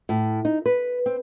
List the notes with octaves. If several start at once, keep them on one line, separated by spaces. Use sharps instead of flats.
A2
D#4
B4
C4